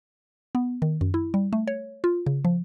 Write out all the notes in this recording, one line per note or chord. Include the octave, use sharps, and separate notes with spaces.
B3
D#3
F#2
E4
G3
A3
C#5
F4
C#3
F3